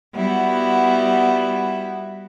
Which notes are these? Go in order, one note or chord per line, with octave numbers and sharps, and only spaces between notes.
G3 B3 E4 F#4